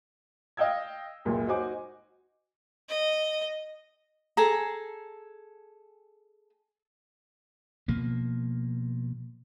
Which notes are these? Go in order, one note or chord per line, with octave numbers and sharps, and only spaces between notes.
D#5 F5 G5 E6 G#6
C#2 F#2 A#2
D#4 F#4 C5 G#5 D6
D#5
G#4 A4 G#5 A#5
B2 F3 A#3